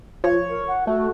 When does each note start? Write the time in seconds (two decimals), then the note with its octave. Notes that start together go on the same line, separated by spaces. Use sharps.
0.24 F3 C#5
0.49 A#4
0.68 F#5
0.87 A3 F#4